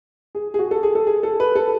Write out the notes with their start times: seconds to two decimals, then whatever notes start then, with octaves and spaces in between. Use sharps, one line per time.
0.35 G#4
0.54 G#4
0.59 F#4
0.71 A4
0.83 G#4
0.95 A4
1.07 G#4
1.23 A4
1.40 B4
1.55 A4